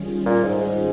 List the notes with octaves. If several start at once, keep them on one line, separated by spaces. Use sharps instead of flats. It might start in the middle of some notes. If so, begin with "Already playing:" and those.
Already playing: D#3 G3 C#4 F4 G#4
A#2
G#2
G#2